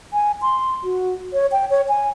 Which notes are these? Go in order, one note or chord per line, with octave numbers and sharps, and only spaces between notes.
G#5
C6
F#4
C#5
G5
C#5
G#5